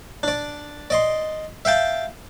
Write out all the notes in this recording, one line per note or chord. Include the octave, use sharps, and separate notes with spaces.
D4 D5
D5 D#5 C6
E5 F5 G5 A5